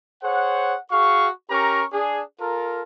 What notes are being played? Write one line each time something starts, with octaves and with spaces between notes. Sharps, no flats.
G#4 C5 C#5 F#5
F#4 G#4 F5 C#6
C#4 G4 A#4 A#5 C#6
D4 G#4
F4 A4 A#4